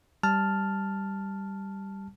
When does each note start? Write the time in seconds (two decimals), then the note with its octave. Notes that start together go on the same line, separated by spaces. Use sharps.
0.23 G3 A5 F6